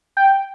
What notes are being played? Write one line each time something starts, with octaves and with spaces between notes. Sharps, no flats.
G5